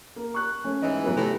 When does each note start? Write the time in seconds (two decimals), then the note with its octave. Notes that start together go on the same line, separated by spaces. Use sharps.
0.16 A#3
0.34 C#6 F#6
0.64 A3 C#4
0.83 G#2 E3 D#5
1.04 G2 F#3 B3
1.16 A2 C3